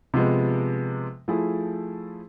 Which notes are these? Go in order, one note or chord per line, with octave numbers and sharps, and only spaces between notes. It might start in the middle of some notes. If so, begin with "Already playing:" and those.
C3 F3 G#3 B3
F3 A3 E4 G#4